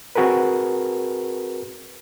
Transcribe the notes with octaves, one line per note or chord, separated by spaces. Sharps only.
C4 F#4 G#4 A#4 B4